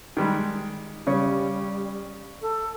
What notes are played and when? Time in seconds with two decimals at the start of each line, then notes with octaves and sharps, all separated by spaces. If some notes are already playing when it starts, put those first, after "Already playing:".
0.17 D#3 G3 G#3
1.07 C#3 G3 C#4
2.42 A4